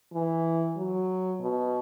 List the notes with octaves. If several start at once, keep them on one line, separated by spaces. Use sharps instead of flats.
E3
F#3
B2